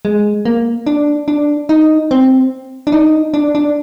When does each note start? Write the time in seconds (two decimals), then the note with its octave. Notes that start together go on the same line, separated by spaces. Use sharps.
0.05 G#3
0.45 A#3
0.87 D4
1.28 D4
1.69 D#4
2.11 C4
2.87 D4
2.92 D#4
3.34 D4
3.55 D4